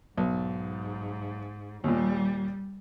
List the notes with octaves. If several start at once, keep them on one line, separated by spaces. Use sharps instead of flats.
B1 G#2
D#2 A#2 G3